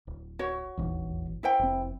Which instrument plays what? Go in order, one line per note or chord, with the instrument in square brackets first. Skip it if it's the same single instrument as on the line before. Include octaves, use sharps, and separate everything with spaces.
[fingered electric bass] D1
[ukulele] F#4 C#5
[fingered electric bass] D#1 G#1 E2
[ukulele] E4 C5 G5
[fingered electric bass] F1 C4